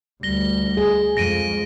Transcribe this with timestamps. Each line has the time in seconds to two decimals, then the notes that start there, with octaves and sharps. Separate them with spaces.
0.23 D2 G3 A#6 G7
0.77 G#4
1.17 F2 G#3 A#6 D7 D#7